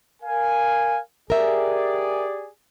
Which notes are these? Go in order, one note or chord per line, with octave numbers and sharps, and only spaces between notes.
A#4 F5 G#5
G4 G#4 A#4 D5 E5